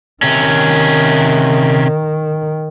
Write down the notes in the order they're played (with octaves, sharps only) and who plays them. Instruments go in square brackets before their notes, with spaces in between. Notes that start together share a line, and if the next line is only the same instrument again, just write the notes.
[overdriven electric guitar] C3 C#4 [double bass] D#3